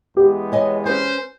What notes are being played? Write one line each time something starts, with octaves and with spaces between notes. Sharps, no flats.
E2 G#3 B3 G4
C#5 D#5 G#5
C#4 B4 C5 G#5